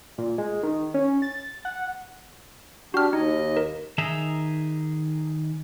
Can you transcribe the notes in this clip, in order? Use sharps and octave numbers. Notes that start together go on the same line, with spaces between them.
A#2
G#3
D#3
C#4
A6
F#5
D4 F#4 G4 F6
D#2 D#4 D#5
A#4
D#3 D#4 G#4 E5 A#5